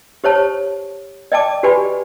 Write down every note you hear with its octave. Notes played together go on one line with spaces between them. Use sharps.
G4 C5 C#5 A5
D5 D#5 G5 A5 D6
F#4 G4 B4 D5 G#5 B5